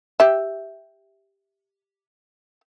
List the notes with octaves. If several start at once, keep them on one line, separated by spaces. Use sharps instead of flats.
G4 E5